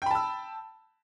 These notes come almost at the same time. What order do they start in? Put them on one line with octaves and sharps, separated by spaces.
G5 B5 A5 E6